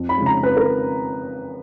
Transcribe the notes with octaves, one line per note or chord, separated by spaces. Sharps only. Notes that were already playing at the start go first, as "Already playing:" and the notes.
Already playing: F2
B5
C#3 F3 G#3
A#5
F2 B4
A#4